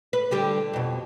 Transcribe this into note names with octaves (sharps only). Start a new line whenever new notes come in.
B4
D3 G3 G4
F2 B2